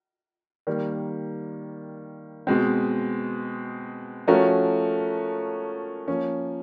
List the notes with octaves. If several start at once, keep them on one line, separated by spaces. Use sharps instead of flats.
D#3 G3 A#3
B2 G#3 C4
F3 A3 C#4 F#4 A#4
F3 A#3 C#4